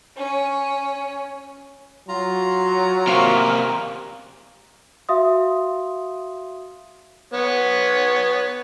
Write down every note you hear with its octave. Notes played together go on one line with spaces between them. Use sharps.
C#4
F#3 F4 A#5
C3 A#3 F5 C#6 F6
F#4 E5 F5 C6 D#6
B3 C#5